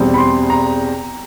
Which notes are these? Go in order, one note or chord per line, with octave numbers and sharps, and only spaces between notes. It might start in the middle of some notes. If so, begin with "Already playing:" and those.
Already playing: E2 B2 G3 C4
B5
C6
A#5